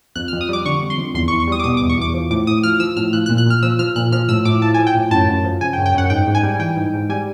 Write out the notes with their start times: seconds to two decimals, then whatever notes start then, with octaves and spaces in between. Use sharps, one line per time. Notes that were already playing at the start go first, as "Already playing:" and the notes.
0.16 F2 F#6
0.28 F6
0.33 F2
0.41 D#6
0.49 G3 D6
0.65 D3 C#6
0.83 F2
0.90 C6
0.98 F2
1.14 E2 C6
1.28 C#6
1.32 E2
1.40 C#6
1.47 G3 D#6
1.60 D6
1.64 B2 D#6
1.77 D6
1.81 E2
1.89 C#6
1.98 E2 D6
2.14 F3
2.31 A2 D6
2.47 A2 D#6
2.63 F3 F6
2.80 F3 E6
2.97 A2 F6
3.13 F3 F#6
3.26 F#6
3.29 A#2
3.38 F#6
3.46 A#2 F6
3.63 F3 E6
3.79 F3 F6
3.96 A#2 F#6
4.12 F3 F6
4.29 A2 E6
4.45 A2 D6
4.62 F3 A5
4.74 G#5
4.78 F3
4.87 G5
4.94 A2
5.11 F#2 A5
5.28 F#2
5.44 F3
5.61 C#3 G#5
5.73 G5
5.78 F#2
5.86 G5
5.94 F#2 F#5
6.10 G#2 G5
6.27 G#2
6.35 G#5
6.43 G3
6.60 E3 G5
6.77 G#2
6.94 G#2
7.09 G3 G#5